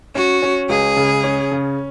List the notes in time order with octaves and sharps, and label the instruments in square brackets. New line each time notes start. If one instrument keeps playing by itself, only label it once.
[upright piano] C#4 [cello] F#4
[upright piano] C#4
[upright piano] C#2 [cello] G#4
[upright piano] C#3
C#4
C#3